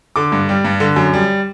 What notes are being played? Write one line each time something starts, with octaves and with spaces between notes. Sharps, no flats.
D3 D6
G2
G3
G2
D3
F#2
G3